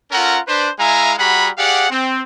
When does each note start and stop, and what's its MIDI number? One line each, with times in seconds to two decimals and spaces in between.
0.11 0.38 61
0.11 0.38 65
0.11 0.38 69
0.11 0.38 70
0.11 0.38 78
0.11 0.38 82
0.48 0.70 62
0.48 0.70 71
0.48 0.70 72
0.79 1.13 56
0.79 1.13 64
0.79 1.13 76
0.79 1.13 77
0.79 1.13 80
0.79 1.13 82
1.18 1.49 55
1.18 1.49 66
1.18 1.49 68
1.18 1.49 78
1.18 1.49 82
1.18 1.49 83
1.57 1.88 67
1.57 1.88 68
1.57 1.88 74
1.57 1.88 77
1.57 1.88 78
1.90 2.22 60